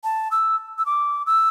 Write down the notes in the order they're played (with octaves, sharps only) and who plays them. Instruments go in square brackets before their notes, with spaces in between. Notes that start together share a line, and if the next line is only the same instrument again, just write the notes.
[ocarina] A5
E6
E6
D6
E6